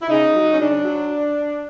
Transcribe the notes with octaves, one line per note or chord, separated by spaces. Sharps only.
E4
C#3 D#4
F#3
C#4
C#3 D4
F#3